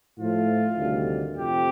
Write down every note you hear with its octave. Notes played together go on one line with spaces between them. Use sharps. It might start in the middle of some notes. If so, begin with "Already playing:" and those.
A2 F3 A3 F4
D2 C3 D#3 G3
F2 C3 F3 A3 G4